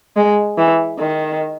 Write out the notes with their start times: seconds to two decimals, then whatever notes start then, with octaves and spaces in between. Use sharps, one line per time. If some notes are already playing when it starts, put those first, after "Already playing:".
0.17 G#3
0.58 E3
0.98 D#3